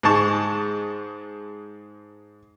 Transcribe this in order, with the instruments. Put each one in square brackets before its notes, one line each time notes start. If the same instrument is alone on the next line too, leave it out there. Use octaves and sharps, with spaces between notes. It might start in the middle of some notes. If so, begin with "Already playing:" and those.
[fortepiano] G#2 G#3 A5 C#6